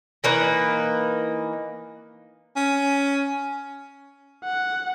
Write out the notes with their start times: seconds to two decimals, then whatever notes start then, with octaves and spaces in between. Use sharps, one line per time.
0.24 E3 A#3 D#4 B4
2.56 C#4
4.44 F#5